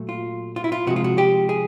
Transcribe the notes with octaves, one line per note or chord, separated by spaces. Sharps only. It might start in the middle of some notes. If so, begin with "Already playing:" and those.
Already playing: A#2 F#3 A3
F4
F4
E4
F4
C3 F3 G#3 F#4
F4
F#4
G4
G#4